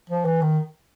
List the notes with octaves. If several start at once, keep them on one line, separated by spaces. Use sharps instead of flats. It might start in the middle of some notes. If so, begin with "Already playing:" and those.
F3
E3
D#3